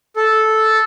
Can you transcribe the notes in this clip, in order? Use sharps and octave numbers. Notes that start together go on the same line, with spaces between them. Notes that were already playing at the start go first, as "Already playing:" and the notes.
A4